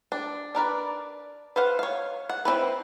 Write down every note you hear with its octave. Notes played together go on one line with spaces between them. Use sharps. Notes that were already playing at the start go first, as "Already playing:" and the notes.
D4
D4 A#4 B4 D5
B4 C5 F5 F#5
C#5 F5
F#5
C4 C#4 E4 B4